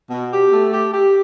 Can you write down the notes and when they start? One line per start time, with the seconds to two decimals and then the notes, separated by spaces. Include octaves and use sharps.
0.11 B2
0.32 G4
0.53 A3
0.73 G4
0.94 G4